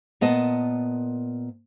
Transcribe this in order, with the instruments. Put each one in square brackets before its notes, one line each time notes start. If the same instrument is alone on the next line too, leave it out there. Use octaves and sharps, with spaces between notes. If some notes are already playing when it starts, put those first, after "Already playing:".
[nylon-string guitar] A#2 B3 D#5 A5